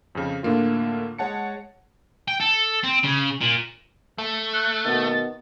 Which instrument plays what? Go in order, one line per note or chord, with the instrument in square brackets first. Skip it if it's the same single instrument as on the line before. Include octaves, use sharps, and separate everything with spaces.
[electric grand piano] F2 C#3
A2 D3 A#3 F4
G#3 C#5 F#5 A5 C#7
[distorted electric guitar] G5
A4
C4
C#3
A#2
[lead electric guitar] A3
[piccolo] F#6
[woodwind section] B2 D#3 B3 [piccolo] A6